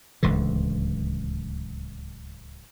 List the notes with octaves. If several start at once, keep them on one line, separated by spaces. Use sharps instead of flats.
D1 C#2 D3 E3